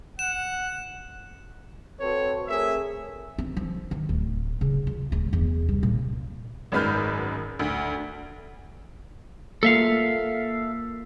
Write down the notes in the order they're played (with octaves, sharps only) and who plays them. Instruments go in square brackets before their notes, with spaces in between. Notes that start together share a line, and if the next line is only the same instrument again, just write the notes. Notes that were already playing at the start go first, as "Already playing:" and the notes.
[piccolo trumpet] F#5 [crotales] E7
[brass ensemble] C4 F#4 A4 B4 C#5
A3 C4 G#4 A#4 C#5 E5
[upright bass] C4
F3
D#3
D1
C#3
F4
D1
E2
C2
A#2
[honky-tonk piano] G#1 F#2 G#3 B4 F6 G6
D2
[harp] A#3 F4 [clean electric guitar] A4 E5 F5